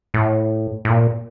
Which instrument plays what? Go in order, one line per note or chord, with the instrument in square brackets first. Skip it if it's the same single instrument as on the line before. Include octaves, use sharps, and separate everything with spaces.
[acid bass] A2
A2
A#2